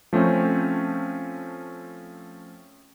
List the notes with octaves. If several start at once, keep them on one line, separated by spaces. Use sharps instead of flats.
F3 A3 C4 C#4